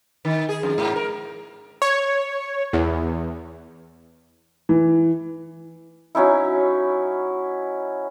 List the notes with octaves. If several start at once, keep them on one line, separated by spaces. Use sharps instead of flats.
D#3
G#4
F2
G#2
A#4
C#5
E2
E3
F#3 C#4 D#4 E4